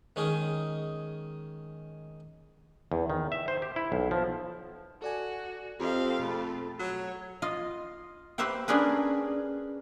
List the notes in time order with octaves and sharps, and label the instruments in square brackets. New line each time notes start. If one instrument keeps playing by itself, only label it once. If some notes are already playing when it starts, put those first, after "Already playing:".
[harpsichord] D#3 G#3 C#4 D#4 G#4 A#4
[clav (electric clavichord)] E2
D#3
E5
C5
G4
E4
B1
F3
[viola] F#4 [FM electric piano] A4 D5 G#5
[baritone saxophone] F2 [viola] C4 F5 [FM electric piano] G4 A4 D#5
[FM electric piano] B2 G#4 B5 [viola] A3
[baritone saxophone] F#3 [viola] C#5
[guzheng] F4 D#5
G4 B4 C5 E5 F5 G5
C#4 D4 G4 G#4 A#4 B4